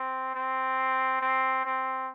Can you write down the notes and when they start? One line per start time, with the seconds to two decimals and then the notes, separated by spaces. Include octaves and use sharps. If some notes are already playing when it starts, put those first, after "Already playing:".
Already playing: C4
0.35 C4
1.21 C4
1.65 C4